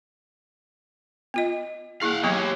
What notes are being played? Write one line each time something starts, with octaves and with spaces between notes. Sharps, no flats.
B3 F4 D#5
A#3 E4 G#4 F5 F#5
F#3 B3 G4 C#5